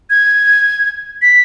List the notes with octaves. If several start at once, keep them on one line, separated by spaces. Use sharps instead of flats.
G#6
B6